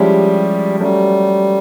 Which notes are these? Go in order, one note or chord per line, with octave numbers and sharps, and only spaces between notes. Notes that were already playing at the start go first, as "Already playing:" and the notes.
Already playing: F3 G3 G#3 C#4 E4 G4
F#3 G3 A3 C#4